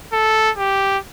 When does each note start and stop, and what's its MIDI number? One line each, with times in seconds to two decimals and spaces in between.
0.13 0.50 69
0.58 0.98 67